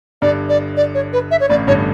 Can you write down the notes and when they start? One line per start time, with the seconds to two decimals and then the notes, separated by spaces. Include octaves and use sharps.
0.22 G1 G2 D5
0.49 D5
0.77 D5
0.95 C#5
1.13 B4
1.31 E5
1.40 C#5
1.49 A1 A2 D5
1.67 G1 G2 C#5